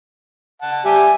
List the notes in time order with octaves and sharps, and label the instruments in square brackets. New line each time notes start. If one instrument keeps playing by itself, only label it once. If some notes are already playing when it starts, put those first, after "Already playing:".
[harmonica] F#5 A5
[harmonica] G3 G4 E5 [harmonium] G#5